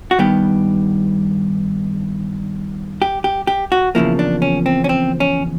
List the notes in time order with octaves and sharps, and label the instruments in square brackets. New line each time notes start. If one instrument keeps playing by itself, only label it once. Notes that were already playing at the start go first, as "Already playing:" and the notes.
[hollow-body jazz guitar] F#4
G2 D#3 G3 B3 G4
G4
G4
G4
F#4
E2 C#3 F3 A#3 E4
D4
C#4
C4
C#4
C4
C#4